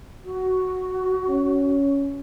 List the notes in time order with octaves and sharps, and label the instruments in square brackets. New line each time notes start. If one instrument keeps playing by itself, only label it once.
[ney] F#4
[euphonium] C#4